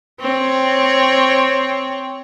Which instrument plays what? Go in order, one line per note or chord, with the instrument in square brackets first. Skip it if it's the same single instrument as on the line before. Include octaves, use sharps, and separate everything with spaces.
[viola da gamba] C4 C#5